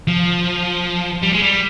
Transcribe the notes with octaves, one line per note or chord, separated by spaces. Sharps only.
F3
G3
G#3
G3